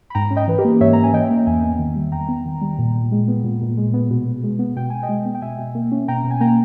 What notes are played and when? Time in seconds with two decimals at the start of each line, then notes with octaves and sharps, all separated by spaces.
0.10 B5
0.15 G#2 G5 A#5
0.31 C#4
0.36 D#5 G5
0.48 E3 B4
0.58 G4 A#4
0.65 A#3
0.81 G#2 C#5 E5
0.93 C#4 A#5
1.04 G#5
1.13 E3 D#5 G5
1.30 A#3
1.47 E2 E5 G#5
1.63 B3
1.79 D#3
1.96 G3
2.12 E2 G5 A#5
2.29 B3
2.46 D#3
2.61 G3
2.78 A#2
2.94 A#2
3.12 G#3
3.28 B3
3.44 A#2
3.61 A#2
3.77 G#3
3.94 B3
4.10 B2
4.27 B2
4.44 G#3
4.59 B3
4.76 B2 G5
4.90 B2 G#5
5.03 D#5 G5
5.09 G#3
5.26 B3
5.35 G5
5.42 B2 E5 G#5
5.58 B2
5.75 A#3
5.92 C#4
6.08 B2 G5 A#5
6.24 B2
6.31 G#5
6.41 A#3 G5 A#5